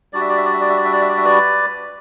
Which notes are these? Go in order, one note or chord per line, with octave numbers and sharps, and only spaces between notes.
G3 D4 F#4 D5
E5
D5
E5
D5
E5
D5
E5
D5
E5
D5
E5
D5
E5
B4 D5